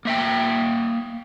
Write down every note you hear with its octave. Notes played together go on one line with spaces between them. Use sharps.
A#3 E5 G5